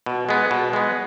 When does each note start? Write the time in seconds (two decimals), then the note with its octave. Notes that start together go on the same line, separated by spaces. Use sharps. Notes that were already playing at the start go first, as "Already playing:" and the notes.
0.06 B2
0.29 G#3 B3
0.51 B2
0.73 G#3 B3